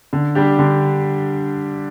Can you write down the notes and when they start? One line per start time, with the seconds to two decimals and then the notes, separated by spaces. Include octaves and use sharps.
0.13 D3
0.35 G3 D4 G4
0.59 D3